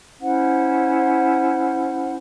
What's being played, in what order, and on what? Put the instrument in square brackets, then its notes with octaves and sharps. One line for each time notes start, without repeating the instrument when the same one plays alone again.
[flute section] C#4 E4 C5 F#5